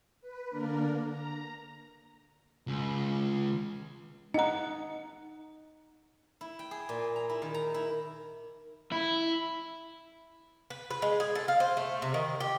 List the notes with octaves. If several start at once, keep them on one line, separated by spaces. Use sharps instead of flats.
B4
D3 A#3 D4 A#4
A#5
C#2
D#4 D#5 F#5 A#5
E4
G5
G#4
A#2
A#5
E4
D#3
A#5
E4
E4
B4
B4
G#3
G#4
A4
F5
C5
A3
C3
D#3
G4